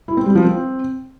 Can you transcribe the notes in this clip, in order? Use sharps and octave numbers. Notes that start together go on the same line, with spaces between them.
E4
C4
G3
F3
C4